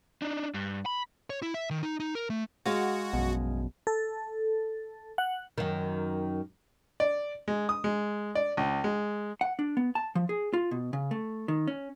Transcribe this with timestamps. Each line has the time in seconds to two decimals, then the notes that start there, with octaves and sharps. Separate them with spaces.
0.22 D4 D#4
0.54 G2
0.86 B5
1.30 C#5
1.42 E4
1.54 E5
1.70 D#3
1.83 D#4
2.00 D#4
2.15 A#4
2.30 A3
2.66 G#3 F#4 D#5 F5
3.13 A#1 F#2 B2
3.87 A4
5.18 F#5
5.58 F#2 D#3
7.00 D5
7.48 G#3
7.69 D#6
7.84 G#3
8.35 D5
8.57 C#2
8.84 G#3
9.41 F#5
9.59 D4
9.77 B3
9.95 A5
10.15 F3
10.29 G#4
10.53 F4
10.71 B2
10.93 C#3
11.11 A3
11.48 D#3
11.67 C#4